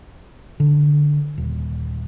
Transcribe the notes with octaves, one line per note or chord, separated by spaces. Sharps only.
D3
D#1